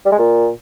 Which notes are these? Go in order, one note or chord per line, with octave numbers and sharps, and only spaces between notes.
G3
G#3
A#2